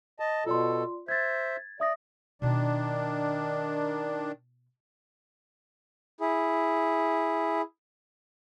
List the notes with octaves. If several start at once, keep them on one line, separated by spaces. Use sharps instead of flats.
D#5 A5
B2 F4 A4 D5 C6
C5 E5 G#6 A6
D5 E5 D#6 A#6
B2 D#3 D4 E4
E4 G#4